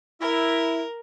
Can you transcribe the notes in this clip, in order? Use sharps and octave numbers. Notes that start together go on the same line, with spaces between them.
E4 A#4